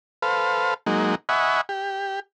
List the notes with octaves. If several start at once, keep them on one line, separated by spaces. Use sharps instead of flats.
A4 B4 C5 F5
F#3 G#3 A#3 D#4
D#5 E5 F#5 G#5 B5 C#6
G4